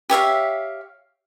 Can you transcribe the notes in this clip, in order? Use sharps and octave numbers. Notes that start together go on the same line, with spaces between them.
G4 C#5 E5 F5